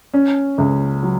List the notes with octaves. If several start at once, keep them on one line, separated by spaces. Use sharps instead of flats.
C#4
C#2
F#3